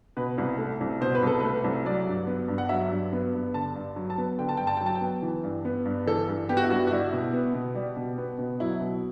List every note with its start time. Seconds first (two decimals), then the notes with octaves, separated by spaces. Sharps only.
0.17 B2 B4
0.38 C2
0.58 A3
0.81 C2
1.01 B2 C5
1.15 B4
1.23 C2 A4
1.40 A3 B4
1.64 C2
1.85 F#3 D5
2.07 G2
2.27 B3
2.48 G2
2.58 F#5
2.69 F#3 E5
2.91 G2
3.13 B3
3.33 G2
3.54 D3 A5
3.75 G2
3.96 F#3
4.10 A5
4.18 B3
4.38 D3 G5
4.49 A5
4.57 G2 G5
4.67 A5
4.77 F#3 G5
4.86 A5
4.95 G5
5.01 B3
5.22 E3
5.44 G2
5.65 B3
5.85 G2
6.06 E3 A4
6.28 G2
6.49 B3 G4
6.57 F#4
6.64 E4
6.70 G2 F#4
6.87 F#4
6.91 G3 E4
7.13 B2
7.33 B3
7.54 B2
7.75 G3
7.97 B2
8.18 B3
8.39 B2
8.60 F#3 E4
8.81 B2